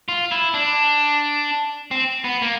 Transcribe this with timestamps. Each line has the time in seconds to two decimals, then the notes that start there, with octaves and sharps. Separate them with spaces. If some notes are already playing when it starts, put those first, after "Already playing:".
0.09 F4
0.32 E4
0.54 D4
1.91 C4
2.24 B3
2.42 A#3